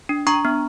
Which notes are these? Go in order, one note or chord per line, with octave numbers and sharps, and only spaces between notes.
D4
D4 A#5 C#6
B3